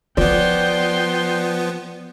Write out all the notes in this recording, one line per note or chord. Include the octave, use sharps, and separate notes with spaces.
F3 B3 F4 D5 G5 C6